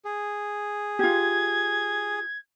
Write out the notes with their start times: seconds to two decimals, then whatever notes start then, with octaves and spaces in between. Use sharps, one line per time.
0.05 G#4
0.99 F4 G4 G#6